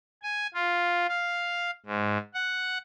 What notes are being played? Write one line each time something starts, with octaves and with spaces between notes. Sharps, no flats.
G#5
F4
F5
G#2
F#5